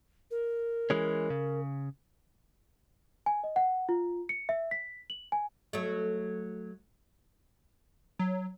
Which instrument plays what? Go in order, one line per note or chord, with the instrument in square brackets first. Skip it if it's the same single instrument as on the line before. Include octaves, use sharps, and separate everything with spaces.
[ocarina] A#4
[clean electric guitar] E3 G#3 C#4
C#3
[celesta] G#5
D#5
F#5
F4
C#7
E5
B6
F#7
G#5
[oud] F#3 A3
[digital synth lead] F#3